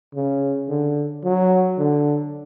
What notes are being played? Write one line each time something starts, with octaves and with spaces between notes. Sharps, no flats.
C#3
D3
F#3
D3